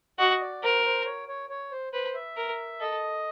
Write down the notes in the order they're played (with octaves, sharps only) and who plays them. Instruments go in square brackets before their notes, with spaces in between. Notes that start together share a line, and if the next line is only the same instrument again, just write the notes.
[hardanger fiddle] F#4 [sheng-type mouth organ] D#5
[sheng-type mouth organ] D5
[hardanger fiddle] A#4 [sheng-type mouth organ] C5
[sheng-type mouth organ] C5
C#5
C#5
C#5
C5
[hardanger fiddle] B4 [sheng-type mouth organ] C5
[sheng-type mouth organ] E5
[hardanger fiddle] A#4
[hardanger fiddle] A4 [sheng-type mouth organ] D#5